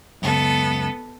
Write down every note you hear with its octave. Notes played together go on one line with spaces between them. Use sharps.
C#2 F#2 B3 A4